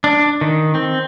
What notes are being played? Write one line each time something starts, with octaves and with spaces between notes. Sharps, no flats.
D4
D#3
C4